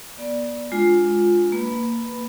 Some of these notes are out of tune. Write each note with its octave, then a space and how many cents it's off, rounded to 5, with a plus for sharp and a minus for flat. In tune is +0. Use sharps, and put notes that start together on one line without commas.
B3 -35 D5 +0
G#3 +0 D4 +0 F4 +10
A#3 -10 B4 +0 B5 +0